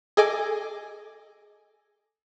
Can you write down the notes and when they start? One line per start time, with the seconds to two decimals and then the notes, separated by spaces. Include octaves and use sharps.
0.17 G#4 A4 D#5 G#5 D6